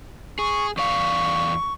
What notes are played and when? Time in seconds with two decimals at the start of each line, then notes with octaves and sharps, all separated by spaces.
0.39 G#4 C#6
0.77 E2 D5 F5 C#6